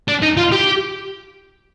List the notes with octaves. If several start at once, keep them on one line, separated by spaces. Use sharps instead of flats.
D4
D#4
F4
G4